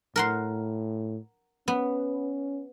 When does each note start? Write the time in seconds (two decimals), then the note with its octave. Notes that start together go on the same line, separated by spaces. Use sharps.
0.16 A2 A#4 F#5 C6
1.68 B3 C#4